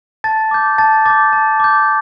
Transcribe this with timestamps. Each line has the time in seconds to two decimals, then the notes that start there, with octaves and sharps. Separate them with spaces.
0.24 A5 A6
0.51 D6 G6
0.78 A5 A6
1.05 D6 A6
1.10 G6
1.33 A5
1.60 D6 G6